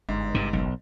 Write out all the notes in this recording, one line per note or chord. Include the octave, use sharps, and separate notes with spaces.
G1 G#2
G2 C3
F#1 B1